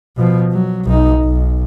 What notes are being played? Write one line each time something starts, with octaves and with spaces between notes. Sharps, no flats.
B2 F3
F#3
B1 D#4
B1